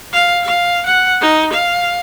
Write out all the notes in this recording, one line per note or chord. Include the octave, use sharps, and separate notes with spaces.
F5
F5
F#5
D#4
F5